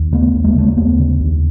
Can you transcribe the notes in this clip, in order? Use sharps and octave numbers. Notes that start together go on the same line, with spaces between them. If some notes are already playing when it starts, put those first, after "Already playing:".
Already playing: D#2
C#3 A3 B3
D#2
G#3 A#3
C#3 A3
A#3
D#2 A3 B3
C#3
D#2